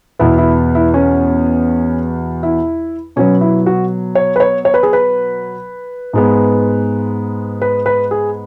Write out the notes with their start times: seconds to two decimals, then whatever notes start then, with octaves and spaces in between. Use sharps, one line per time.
0.19 E2 B2 B3 E4
0.38 E4
0.75 E4
0.94 C#4
2.43 E4
3.16 B2 F#3 B3 C#4
3.41 E4
3.66 F#4
4.15 C#5
4.36 B4
4.40 C#5
4.65 C#5
4.74 B4
4.83 G#4
4.93 B4
6.13 G#2 G#3 B3
7.62 B4
7.86 B4
8.11 G#4